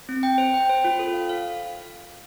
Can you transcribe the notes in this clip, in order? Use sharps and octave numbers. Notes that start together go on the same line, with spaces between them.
C4
G5
C5
G5
C5
F4
A4
F5
F5